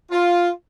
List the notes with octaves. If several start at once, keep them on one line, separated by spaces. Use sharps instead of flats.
F4